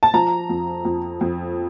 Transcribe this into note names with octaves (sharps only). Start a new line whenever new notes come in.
A5
F3 A#5
F2
F2
F2